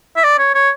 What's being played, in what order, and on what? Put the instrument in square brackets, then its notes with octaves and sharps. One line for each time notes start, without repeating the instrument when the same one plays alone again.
[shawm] E5
D5
C#5
C#5